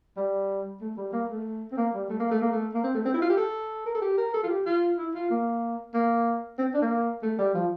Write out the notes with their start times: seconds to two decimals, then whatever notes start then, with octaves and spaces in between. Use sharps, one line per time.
0.17 G3
0.81 A3
0.97 G3
1.13 A#3
1.30 A3
1.72 C4
1.77 A#3
1.94 G3
2.10 A3
2.19 A#3
2.31 A3
2.42 A#3
2.52 A3
2.74 A#3
2.83 C4
2.94 A3
3.05 C4
3.14 E4
3.22 F4
3.30 G4
3.37 A4
3.86 A#4
3.95 A4
4.01 G4
4.18 A#4
4.34 A4
4.43 F4
4.49 G4
4.66 F4
4.98 E4
5.14 F4
5.30 A#3
5.94 A#3
6.59 C4
6.74 D4
6.81 A#3
7.22 A3
7.39 G3
7.54 F3